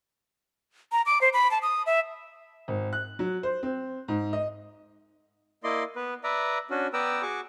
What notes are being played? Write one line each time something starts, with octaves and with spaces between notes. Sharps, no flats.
A#5
D6
C5
B5
A5
D#6
E5
G#1
F#6
F#3
C5
C4
G#2
D#5
A#3 E4 D5 D#5 C6
B3 B4
B4 D5 E5 A#5
C#4 D4 F#4
B3 B4 D5 G5 A#5 E6
F#4 G#4 C#6 D6